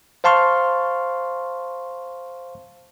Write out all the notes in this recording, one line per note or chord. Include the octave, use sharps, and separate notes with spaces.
C5 F5 A5 C6 C#6 F6